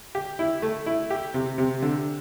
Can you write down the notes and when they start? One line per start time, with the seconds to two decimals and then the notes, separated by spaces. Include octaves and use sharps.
0.15 G4
0.39 E4
0.62 A3
0.86 E4
1.10 G4
1.34 C3
1.58 C3
1.82 D3